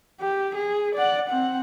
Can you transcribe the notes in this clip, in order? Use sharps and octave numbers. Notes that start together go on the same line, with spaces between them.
G4
G#4
D5 F#5
C4 F#5